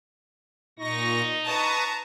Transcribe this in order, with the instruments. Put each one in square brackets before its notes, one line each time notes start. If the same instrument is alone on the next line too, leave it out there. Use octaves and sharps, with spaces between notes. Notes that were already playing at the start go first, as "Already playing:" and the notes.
[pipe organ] A#2 C#6 A#6 [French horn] D#4
[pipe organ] B4 C#6 D#6 [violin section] A5 A#5